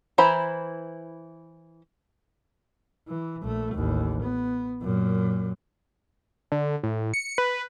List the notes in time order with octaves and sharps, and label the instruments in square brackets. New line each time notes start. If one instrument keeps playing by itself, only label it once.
[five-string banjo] E3 E4 C5 A#5 B5
[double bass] E3
A#1 A3
A1 D#2
B3
F#2 A#2
[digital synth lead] D3
A2
C#7
B4